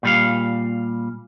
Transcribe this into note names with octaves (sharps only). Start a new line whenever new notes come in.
A#2 G3 F5